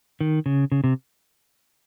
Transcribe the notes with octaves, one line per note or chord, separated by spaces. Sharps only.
D#3
C#3
C#3
C3